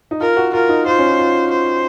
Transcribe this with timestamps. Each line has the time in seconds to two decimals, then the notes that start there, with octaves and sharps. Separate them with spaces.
0.11 D#4
0.20 F4 A#4
0.37 F#4
0.53 F4 A#4
0.69 D#4
0.86 F4 C5
0.99 C#4
1.08 D#4
1.19 F4
1.51 C5